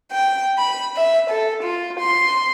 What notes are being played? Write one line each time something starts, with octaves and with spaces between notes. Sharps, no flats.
G5
B5
E5
A4
F4
C6